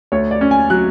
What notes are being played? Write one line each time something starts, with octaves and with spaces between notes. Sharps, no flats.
D2 C#5
D5
C#4
G#5
F#3 F#6